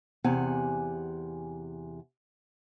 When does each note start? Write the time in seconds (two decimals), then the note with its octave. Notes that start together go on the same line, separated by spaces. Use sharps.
0.24 E2 C3 F#5 G#5